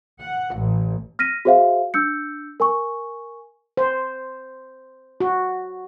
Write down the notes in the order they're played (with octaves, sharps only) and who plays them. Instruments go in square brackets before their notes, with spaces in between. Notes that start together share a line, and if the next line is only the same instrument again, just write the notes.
[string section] F#5
A1
[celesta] F6 A#6 B6 D#7
F#4 G#4 C5 E5 F5
D4 E6 G6 C#7
A#4 G#5 C#6
[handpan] C5
F#4